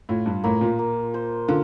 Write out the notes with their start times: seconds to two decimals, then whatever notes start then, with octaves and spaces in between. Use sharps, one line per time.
0.09 A2 F4
0.26 G2
0.44 A2 A#3
0.61 A#2
0.79 A#3
1.14 C5
1.48 D3 F4